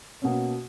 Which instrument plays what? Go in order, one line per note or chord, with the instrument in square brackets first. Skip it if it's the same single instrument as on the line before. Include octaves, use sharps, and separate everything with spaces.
[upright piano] B2 A#3 C#4